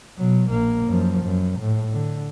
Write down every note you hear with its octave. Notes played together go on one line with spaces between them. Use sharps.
B2 F#3
A#1 A#3
F#2 F3
F#2
A2
D3